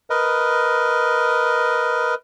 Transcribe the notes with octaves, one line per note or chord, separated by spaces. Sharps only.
A#4 B4 D#5